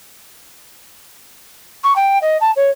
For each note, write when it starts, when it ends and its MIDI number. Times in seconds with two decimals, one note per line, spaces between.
1.83 1.93 85
1.96 2.18 79
2.21 2.37 75
2.41 2.51 81
2.56 2.70 73